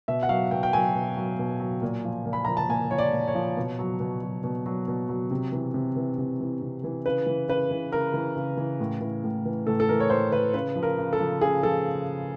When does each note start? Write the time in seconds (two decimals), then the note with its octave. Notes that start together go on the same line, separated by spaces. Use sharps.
0.08 B2 E5
0.23 F#5
0.29 F#3 F5
0.51 B2 G5
0.63 G5
0.73 F#3 G#5
0.95 B2
1.17 F#3
1.39 B2
1.60 F#3
1.81 A#2
2.04 F3
2.26 A#2
2.33 B5
2.45 F3 A#5
2.57 A5
2.69 A#2 G#5
2.91 F3 C#5
2.98 D5
3.13 A#2
3.28 C#5
3.35 F3
3.57 B2
3.79 F#3
4.00 B2
4.22 F#3
4.44 B2
4.66 F#3
4.88 B2
5.09 F#3
5.31 C3
5.52 E3
5.74 C3
5.96 E3
6.18 C3
6.40 E3
6.62 C3
6.84 E3
7.06 C#3 B4
7.27 E3
7.48 C#3 B4
7.71 E3
7.92 C#3 A#4
8.14 E3
8.36 C#3
8.57 E3
8.80 A2
9.01 E3
9.24 A2
9.45 E3
9.67 A2 A4
9.80 A4
9.89 E3 A#4
10.00 C#5
10.10 A2 C5
10.32 E3 B4
10.54 C#3 B4
10.76 F3
10.83 A#4
10.98 C#3
11.13 A4
11.20 F3
11.41 C#3 G#4
11.63 F3 A4